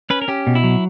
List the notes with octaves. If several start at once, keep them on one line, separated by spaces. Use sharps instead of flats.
C#4 B4
A#4
C#4 G4
B2
E4
F#3